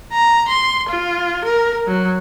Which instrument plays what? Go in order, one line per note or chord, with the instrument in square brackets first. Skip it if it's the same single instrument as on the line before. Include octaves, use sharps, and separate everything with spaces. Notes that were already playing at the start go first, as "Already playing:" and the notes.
[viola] A#5
C6
F4
A#4
F#3